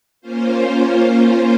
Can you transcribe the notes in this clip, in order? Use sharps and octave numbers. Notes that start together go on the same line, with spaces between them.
A#3 C#4 F4 C5